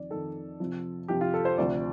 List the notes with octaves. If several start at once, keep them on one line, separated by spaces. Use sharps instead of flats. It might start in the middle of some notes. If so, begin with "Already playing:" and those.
Already playing: F2 D#3 D5
F2 D#3 A4
F2 C3 F3
F2 C3 F3 G4
F4
A4
C5
D2 C3 F3 D5